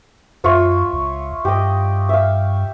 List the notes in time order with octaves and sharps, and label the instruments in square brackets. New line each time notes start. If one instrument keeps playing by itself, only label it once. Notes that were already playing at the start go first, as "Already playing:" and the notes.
[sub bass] F#2 [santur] F4 C#5 E5
[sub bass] C#2
[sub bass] G2 [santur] G4 D#5
[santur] E5 F5